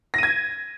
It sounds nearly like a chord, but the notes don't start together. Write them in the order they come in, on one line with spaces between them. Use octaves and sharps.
A#6 D#7 G#6